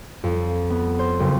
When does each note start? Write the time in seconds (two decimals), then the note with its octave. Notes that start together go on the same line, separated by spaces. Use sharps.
0.24 F2
0.70 B3
0.99 C5
1.20 F#1